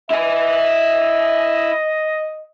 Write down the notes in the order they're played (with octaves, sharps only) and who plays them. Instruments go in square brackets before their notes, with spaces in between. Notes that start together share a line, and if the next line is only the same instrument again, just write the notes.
[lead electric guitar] E4 G#5 [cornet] D#5